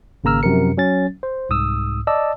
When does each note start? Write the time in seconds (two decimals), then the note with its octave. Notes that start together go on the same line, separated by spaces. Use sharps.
0.24 G#1 C#3 A#3 A#5 E6 F6
0.43 F#2 C3 F3 A#4 C#7
0.77 F#3 C#4 A6
1.23 C5
1.49 C2 G#2 D#6 E6
2.07 D5 D#5 A5 E6